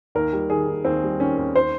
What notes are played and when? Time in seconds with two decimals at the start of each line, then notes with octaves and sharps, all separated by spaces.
0.15 D#2 A#4
0.33 G3
0.50 D#3 G#4
0.67 D#2
0.85 D#2 C4
1.03 G3
1.20 D#3 C#4
1.37 D#2
1.56 C5